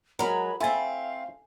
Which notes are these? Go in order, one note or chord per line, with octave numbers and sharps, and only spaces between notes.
F#3 G#3 A#4 B5
A3 C4 E4 A4 F5 G#5 A6